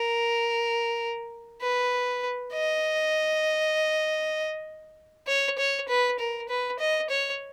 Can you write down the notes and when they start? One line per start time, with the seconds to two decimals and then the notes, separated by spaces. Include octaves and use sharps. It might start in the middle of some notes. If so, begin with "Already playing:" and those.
Already playing: A#4
1.62 B4
2.54 D#5
5.27 C#5
5.58 C#5
5.88 B4
6.19 A#4
6.49 B4
6.79 D#5
7.10 C#5